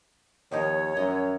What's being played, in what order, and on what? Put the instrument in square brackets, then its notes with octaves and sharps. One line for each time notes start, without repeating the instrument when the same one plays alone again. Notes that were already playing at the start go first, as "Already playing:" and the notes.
[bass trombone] D#2 [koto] D#3 F3 D#4 [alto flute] C#5
[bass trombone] F#2 [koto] D#5